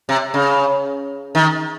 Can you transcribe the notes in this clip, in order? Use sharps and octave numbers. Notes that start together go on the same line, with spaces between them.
C3
C#3
D#3